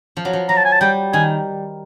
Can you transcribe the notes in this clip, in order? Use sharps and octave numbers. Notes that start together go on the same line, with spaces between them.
F3
F#3
F3
F#3 A#5
A5
G#5
A5
G3 G5
D#3 G#5